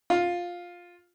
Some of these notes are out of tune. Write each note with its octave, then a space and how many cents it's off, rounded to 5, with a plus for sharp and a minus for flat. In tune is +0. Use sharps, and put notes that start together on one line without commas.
F4 +10